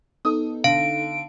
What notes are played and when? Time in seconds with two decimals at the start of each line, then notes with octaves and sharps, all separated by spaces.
0.25 B3 D#4 A4 D#6
0.64 D3 F5 D7